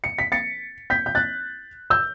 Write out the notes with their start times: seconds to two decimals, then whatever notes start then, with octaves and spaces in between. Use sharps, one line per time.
0.04 C#7
0.18 B6
0.32 A6 C#7
0.90 G6 B6
1.06 G6
1.15 F#6 A6
1.90 E6 G6